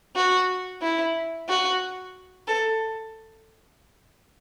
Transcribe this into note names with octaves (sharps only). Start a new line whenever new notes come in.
F#4
E4
F#4
A4